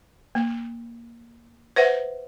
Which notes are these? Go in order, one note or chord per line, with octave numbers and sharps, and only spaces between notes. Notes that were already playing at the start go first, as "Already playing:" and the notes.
A#3
B4 C5 E5 F#5